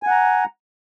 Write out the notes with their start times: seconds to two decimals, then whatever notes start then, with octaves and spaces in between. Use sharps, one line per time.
0.03 G#5
0.07 F#5
0.11 A#5